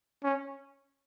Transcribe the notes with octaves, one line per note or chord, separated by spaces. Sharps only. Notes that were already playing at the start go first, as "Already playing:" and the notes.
C#4